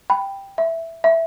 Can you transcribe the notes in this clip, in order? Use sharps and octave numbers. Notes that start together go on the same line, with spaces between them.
G5 B5
E5
E5